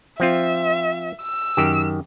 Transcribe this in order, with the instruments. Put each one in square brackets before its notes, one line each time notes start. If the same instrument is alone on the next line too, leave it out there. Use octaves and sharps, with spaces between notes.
[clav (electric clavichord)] F3 C4 F4 [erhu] E5
[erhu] E6
[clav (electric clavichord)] F#2 D#3 G4